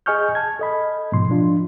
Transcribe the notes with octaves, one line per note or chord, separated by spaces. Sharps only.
G#4 D#5 G#5 C#6 F6 G6
A5 G#6
A4 D#5 B5
G#2 B2 F3 C6
F3 D4 F4